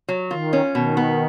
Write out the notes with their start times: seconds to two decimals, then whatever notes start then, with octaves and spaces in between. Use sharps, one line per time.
0.09 F#3
0.31 D#3 F4
0.53 C#4
0.75 B2 D#3
0.97 B3